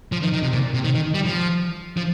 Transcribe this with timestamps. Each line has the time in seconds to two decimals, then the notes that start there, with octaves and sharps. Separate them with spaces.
0.12 F3
0.23 D#3
0.33 D#3
0.42 C3
0.53 A#2
0.74 C3
0.84 D#3
0.95 D#3
1.14 G3
1.25 F3
1.97 F3